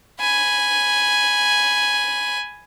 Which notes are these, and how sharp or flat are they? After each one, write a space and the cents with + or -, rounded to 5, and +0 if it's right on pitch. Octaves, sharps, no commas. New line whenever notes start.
G#5 +0 B5 +0